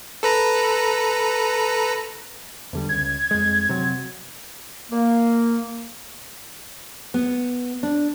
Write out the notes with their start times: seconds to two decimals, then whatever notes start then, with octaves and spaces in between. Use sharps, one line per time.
0.23 A4 B4 A#5
2.73 E2 D3 G3
2.89 C#2 G#6
3.31 F2 G#3
3.69 C3 F#3
4.91 A#3
7.14 B3
7.83 D4